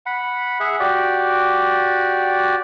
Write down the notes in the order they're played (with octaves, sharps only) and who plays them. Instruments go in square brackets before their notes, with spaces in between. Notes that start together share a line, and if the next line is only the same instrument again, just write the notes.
[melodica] F#5 B5
G#4 E5 F#5
F#4 G4 D5